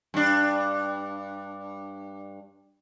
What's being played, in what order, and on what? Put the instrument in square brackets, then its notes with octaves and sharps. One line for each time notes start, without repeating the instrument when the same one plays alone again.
[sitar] G2 D4